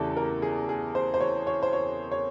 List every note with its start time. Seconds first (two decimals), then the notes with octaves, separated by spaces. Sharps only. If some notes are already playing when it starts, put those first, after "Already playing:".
Already playing: E2 C#3 E3 A3 G4 A4
0.17 A#4
0.42 G#4
0.69 G#4
0.95 C5
1.14 C5
1.20 C#5
1.47 C#5
1.63 C5
1.73 C#5
2.11 C#5